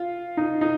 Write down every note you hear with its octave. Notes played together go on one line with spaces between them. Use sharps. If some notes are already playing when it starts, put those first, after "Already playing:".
Already playing: F4
D#4
D#4